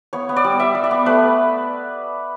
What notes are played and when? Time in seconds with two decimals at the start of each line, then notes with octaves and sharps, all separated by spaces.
0.13 B3 C#5
0.29 B3
0.36 D5
0.44 G3
0.60 G3 E5
0.75 G3
0.84 D5
0.91 B3
1.06 A3 B4